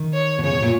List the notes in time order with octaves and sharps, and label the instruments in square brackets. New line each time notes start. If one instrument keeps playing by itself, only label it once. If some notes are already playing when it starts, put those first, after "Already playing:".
Already playing: [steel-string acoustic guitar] D#3
[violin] C#5
[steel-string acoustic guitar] B2
[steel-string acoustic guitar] C#3 [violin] C#5
[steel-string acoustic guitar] B2
A#2